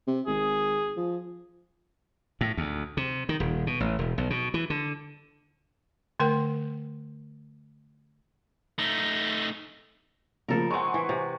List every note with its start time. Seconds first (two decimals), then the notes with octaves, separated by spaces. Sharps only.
0.07 C3
0.27 G#1 G#4
0.97 F3
2.41 A2
2.57 D2
2.97 C3
3.29 D#3
3.40 D#1
3.67 B2
3.80 A1
3.99 E1
4.18 B1
4.30 B2
4.54 E3
4.70 D3
6.20 D3 A3 A#4 G5
8.78 A3 D#4
10.48 C#3 F3 A#3 A4 A#4
10.70 G#3 C4 F#5 G#5 C#6
10.94 E3
11.09 C3